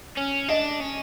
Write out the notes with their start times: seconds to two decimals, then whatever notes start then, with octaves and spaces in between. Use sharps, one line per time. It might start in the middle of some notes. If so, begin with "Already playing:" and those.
0.17 C#4
0.48 D4 D#5
0.80 C#4